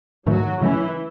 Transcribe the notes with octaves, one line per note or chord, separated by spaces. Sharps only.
G#2 D#3 F#3 A3 F#4
C#3 E3 F#3 A3 C#4 E4